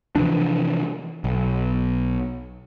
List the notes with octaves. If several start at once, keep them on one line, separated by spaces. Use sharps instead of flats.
C3 E3 F3 D4
B1